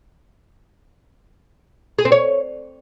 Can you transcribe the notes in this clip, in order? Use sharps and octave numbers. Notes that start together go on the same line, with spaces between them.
G#4
C4
C#5